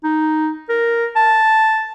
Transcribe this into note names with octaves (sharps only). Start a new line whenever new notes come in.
D#4
A#4
A5